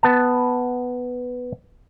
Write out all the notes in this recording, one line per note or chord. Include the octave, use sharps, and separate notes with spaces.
B3 A5